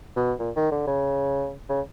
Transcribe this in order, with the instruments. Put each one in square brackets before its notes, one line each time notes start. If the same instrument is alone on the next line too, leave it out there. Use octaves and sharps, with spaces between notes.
[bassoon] B2
A#2
D#3
D3
C#3
C#3